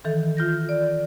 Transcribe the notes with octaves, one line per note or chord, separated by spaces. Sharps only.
D#3 E3 A4
F4 G6 A#6
D5